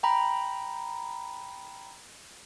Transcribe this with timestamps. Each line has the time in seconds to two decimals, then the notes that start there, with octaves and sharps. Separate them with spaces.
0.03 G5 A#5 B5